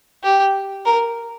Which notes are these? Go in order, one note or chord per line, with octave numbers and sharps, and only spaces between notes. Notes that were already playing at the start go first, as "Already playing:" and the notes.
G4
A#4